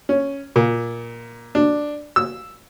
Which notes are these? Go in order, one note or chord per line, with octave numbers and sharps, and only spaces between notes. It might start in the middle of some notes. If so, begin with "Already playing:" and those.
C#4
A#2
D4
E6